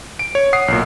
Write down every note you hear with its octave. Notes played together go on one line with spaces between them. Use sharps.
D7
C#5
F#5 D#6 C7
B1 A#2